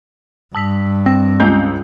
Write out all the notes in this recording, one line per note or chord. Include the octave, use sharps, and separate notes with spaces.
G2 A5 E6 B6
C4 E6 A#6
C#2 C#4 D#5 G#5 G6